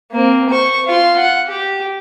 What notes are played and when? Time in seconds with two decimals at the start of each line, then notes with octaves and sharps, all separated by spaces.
0.12 A#3 C4
0.50 C5 C#6
0.86 F4 C6
1.18 F#5
1.49 G4